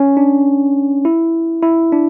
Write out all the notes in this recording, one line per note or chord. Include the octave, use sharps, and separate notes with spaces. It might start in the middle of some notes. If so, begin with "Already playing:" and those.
Already playing: C#4
D4
E4
E4
D4